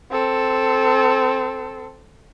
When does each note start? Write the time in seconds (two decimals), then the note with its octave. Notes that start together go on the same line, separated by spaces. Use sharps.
0.11 C4 A4